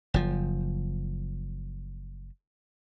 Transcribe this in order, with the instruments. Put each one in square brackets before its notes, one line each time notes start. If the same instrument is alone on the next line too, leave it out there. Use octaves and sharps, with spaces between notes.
[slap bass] F#1 F3